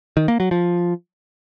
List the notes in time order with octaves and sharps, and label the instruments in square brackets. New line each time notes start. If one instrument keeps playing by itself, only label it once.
[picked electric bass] D#3
A#3
F#3
F3